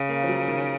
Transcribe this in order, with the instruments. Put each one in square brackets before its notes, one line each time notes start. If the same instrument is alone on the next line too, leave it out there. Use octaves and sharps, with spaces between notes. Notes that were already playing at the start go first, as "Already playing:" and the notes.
Already playing: [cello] C#3
[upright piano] A#3
F3
F#3
D#3